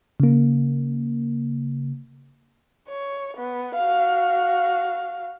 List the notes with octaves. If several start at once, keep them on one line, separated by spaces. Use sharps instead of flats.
C#3 A#3
C#5
B3
F#4 F5